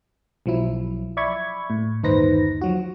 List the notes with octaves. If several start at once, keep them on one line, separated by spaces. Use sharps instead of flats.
B1 F3 F#3 E4
D5 E5 B5 C#6 G#6
A2
G1 D#2 D#4 B4 C5 A#6
F3 F#3 F#4